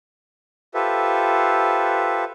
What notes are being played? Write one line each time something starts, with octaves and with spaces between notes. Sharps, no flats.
F4 G4 A4 B4 C5 E5